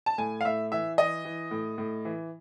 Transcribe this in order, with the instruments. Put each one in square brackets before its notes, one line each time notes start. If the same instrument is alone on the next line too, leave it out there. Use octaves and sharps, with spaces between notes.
[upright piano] A5
A2 G#5
F5
A2 E5
E3 E5
E3 D#5
E3
A2
A2
E3